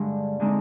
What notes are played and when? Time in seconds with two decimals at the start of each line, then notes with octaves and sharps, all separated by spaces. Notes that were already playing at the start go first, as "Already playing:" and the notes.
Already playing: G2 D3 G#3
0.40 D3 G#3 C4 D#4